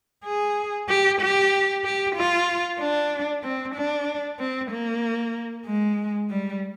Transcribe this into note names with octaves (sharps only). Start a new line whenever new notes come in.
G#4
G4
G4
G4
F4
D4
C4
D4
C4
A#3
G#3
G3